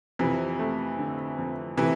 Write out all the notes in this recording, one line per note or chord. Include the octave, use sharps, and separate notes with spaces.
F2 C3 E3
A3
D3
F2
C3 E3 A3